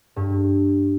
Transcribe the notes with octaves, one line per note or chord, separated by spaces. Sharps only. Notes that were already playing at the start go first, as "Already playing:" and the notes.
G2